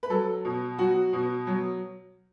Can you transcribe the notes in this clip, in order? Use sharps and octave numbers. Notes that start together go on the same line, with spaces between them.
B4
F#3 A4
B2
F#3 F#4
B2
F#3